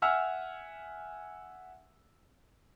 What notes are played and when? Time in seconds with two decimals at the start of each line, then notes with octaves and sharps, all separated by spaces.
0.02 E5 F#5 G#5 E6 F6